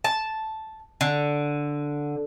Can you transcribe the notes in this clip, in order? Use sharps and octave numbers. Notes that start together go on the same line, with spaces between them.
A5
D3